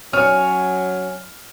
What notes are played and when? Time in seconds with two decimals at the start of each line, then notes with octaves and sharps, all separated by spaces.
0.13 F#3 C#4 F6